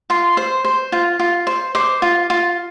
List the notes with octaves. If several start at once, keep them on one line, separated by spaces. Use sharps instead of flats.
F4 C6
C5
C5
F4
F4
C5
C5 D6
F4
F4